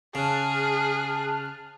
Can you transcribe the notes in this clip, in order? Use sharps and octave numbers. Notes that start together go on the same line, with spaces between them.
C#3 G#4 A5 F6 F#6